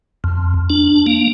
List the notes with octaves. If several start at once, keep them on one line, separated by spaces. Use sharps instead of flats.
F2
D4
A#3